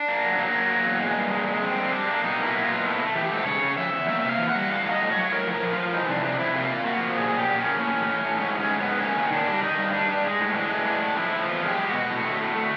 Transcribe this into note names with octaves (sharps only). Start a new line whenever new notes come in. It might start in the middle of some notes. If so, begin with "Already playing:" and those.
Already playing: D4
A#3
F#3
F#3 A#3
F#3
F#3
E2
G#3
G2
G#3
G#3
F2 C4
D3
G3 D4
A#3
B2 D#4
A#3
E4
F#3
B2 F4
A3 E4
A3
E3 G4
G#2 A4
C#3 C#5
C#3
F3 E5
E2
A#3 E5
C3 E5
F5
E3
F#5
G3
A2 F5
F#3
D#5
A2
F#3 C#5
A2 A#4
F3
A#4
F3
F3 F4
E3 D#4
C3 D4
C3 D4
C3 E4
A#3 F4
A#3
A#3 F#4
F3
A#2 G#4
A#2 G4
A#2
A#3 C#4
A2
A2
A2
A2
G#2 C#4
G#3
C#4
G#2
B3
G#3
A#3 C#4
D#3
D#3 D4
G3
D#3 D#4
G2
G3 D4
G2
G#3
A2
E3 D4
G#3
A2 D4
A3
F3 E4
F3
E2 F4
G#3 G4
G#3
B2 F#4
A2
A3
A2
A3